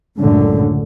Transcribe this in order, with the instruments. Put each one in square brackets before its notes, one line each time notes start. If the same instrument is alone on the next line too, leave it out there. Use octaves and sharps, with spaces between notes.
[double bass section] C#2 F#2 A2 D3